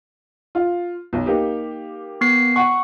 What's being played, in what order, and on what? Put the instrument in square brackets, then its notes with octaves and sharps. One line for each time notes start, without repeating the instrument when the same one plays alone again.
[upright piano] F4
B1
A#3 D#4 G4
[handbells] B3 C7
[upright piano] F#5 [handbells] C#6